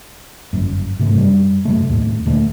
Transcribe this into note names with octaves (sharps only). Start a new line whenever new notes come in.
G1 F#2
G#2 C3 A3
F#2 G3
F#2 C3 A3
D#2 A2 A3
D2 A#2 A3